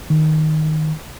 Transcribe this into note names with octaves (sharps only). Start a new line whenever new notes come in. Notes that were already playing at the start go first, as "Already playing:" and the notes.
D#3